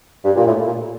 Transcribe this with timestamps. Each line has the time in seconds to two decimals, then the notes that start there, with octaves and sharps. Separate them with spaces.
0.25 G2
0.37 A#2
0.47 A2
0.66 A#2